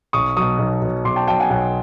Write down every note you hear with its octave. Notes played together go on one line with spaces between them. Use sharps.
B1 C#6 D#6
B2 F#3 C#6 D#6
B1
B2 F#3
B1 C6 D6
G5 A5
B2 F#3 G5 A5
F#5 G#5
B1 F#5 G#5